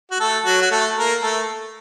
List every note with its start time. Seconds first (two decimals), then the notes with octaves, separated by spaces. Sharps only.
0.11 F#4
0.20 A3 A4
0.45 F#3 F#4
0.61 F#4
0.71 A3 A4
0.97 A#3 A#4
1.23 A3 A4